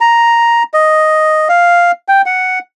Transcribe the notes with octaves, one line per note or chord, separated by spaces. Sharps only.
A#5
D#5
F5
G5
F#5